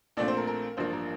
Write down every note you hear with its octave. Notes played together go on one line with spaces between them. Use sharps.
A#1 A#2 A3 C4 D4 D5
C5
A#4
A#4
A1 G2 F3 A#3 D4 C5
A#4